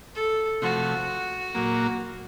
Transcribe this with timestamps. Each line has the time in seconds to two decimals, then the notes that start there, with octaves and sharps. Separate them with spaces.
0.15 A4
0.62 C3 F3 A3 F#4
1.55 A#2 F#3 A#3